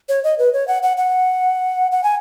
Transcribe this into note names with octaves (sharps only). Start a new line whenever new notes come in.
C#5
D#5
B4
C#5
F#5
F#5
F#5
F#5
G#5